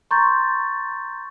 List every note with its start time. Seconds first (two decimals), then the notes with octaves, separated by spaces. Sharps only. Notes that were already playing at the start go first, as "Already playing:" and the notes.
0.11 A#5 C6 C#6 G6 A6